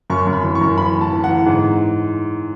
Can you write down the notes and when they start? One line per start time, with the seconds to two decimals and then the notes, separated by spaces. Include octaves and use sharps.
0.10 F#2 C#6
0.27 F#2
0.33 B5
0.44 E3
0.55 C#6
0.61 F#2
0.78 E3 B5
0.96 A2
1.01 A5
1.13 E3
1.24 F#5
1.29 E3
1.46 G#2 F#5